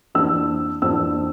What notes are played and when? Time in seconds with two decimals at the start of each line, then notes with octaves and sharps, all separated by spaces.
0.15 F2 E3 A#3 D4 E6
0.82 F2 E3 A#3 D4 E6